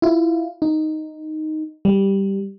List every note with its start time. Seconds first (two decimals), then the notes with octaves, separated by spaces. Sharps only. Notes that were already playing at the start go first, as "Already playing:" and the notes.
0.02 E4 F4
0.62 D#4
1.85 G3